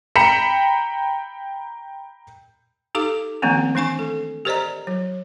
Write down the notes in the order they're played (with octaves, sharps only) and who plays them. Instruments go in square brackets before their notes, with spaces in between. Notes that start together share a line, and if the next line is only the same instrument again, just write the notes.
[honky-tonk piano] G5 A#5 B5 B6 C#7 E7
[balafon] D#4 G4 A4 F5 D6
D#3 F3 A3 A#3 C4 C#4
E3 A3 D4 G#5 C#6
A4
G4 A#4 C5 D5 D#5 A#5
F#3